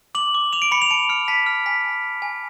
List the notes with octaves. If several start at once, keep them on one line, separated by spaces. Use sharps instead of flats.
D6 F#7
D6
D6 F7
D7
B5 C#7
F7
A5 D7
F6 C#7
A5 B6
F6
G#5 B6
G#5
G#5
G#5